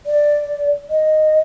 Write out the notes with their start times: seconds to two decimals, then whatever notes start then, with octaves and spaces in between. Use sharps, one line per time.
0.06 D5
0.90 D#5